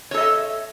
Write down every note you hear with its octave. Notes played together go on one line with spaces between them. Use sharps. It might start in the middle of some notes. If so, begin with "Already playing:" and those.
A4 C#5 D#5 E5